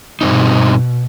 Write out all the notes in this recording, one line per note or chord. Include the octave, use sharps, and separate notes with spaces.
G2 B2 C4 D#4